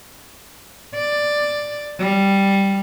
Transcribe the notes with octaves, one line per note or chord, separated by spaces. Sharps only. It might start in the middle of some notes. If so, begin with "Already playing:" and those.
D5
G3